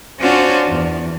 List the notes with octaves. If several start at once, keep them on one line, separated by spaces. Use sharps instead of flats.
C#4 D4 F4 F#4 C5
E2